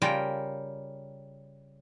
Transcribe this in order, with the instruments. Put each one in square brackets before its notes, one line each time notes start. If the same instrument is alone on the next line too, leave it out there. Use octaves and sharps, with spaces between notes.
[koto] C#3 G3 F4 A#4 G5